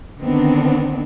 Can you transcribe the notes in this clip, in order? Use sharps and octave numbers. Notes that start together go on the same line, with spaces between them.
D3 D#3 B3 C4 D4